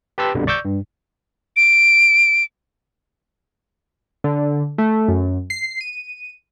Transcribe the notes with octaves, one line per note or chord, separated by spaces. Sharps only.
G4 B4 A5 C6 E6
A#1 F2 B2 D3 G3
D5 C#6 D6 E6 G6
G2
D7
D3
A3
F#2
C7
D#7